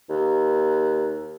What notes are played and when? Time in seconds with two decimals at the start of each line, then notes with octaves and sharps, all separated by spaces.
0.10 D#2